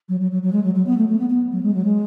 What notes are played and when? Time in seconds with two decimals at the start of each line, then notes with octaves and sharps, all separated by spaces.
0.09 F#3
0.20 F#3
0.32 F#3
0.43 F#3
0.53 G#3
0.64 F#3
0.75 F#3
0.86 B3
0.98 A3
1.08 A3
1.19 B3
1.30 B3
1.52 F#3
1.63 G#3
1.74 F#3
1.85 G#3